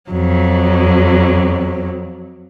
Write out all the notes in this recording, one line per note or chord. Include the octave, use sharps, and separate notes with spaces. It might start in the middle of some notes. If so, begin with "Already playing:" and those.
F2 F#3